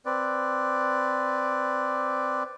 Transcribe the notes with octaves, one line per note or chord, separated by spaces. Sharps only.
C4 B4 D5